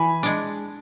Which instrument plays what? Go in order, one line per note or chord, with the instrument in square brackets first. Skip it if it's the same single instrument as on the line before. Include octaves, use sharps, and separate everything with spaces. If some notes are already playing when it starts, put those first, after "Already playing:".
Already playing: [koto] E3 [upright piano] G#5 B5
[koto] G#3 D4